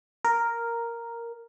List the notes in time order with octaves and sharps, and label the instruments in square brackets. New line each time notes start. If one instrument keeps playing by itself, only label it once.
[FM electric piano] A#4